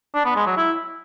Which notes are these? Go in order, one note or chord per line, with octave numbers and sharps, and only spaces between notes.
D4
B3
G#3
F#3
E4